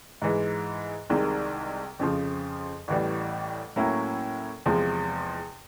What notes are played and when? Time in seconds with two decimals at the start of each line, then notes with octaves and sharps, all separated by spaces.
0.22 G#2 E3 G#3
1.10 C2 C3 D#3 G#3
1.99 F2 C#3 F3
2.88 A1 A2 E3 G3
3.76 A2 F#3 A#3 C#4 E4
4.66 E2 C3 F3 G#3